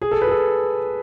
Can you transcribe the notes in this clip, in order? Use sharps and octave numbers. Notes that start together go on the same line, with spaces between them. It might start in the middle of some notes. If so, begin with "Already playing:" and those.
G#4
A4
B4
G#4
A4